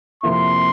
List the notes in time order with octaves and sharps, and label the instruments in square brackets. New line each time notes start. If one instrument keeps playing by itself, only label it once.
[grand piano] F2 C3 F3 A#3 E4 [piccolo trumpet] C6